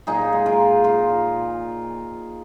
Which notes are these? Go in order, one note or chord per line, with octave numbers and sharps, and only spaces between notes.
A#2 D#4 G#4
G#3
F4 A#4
A#2
F3 F4 A#4
A#2